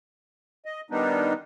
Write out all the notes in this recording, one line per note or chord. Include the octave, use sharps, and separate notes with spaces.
D#5
D#3 G3 B3 D4 D#4